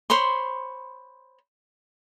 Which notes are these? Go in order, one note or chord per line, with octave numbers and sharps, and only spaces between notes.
C5 C#5 B5 C6